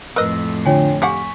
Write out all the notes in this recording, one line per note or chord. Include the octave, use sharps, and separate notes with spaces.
F2 A2 A#4 B4 D#5 E6
D3 D4 F4 C#5 G5 G#5
G4 F5 F#5 G#5 C#6 B6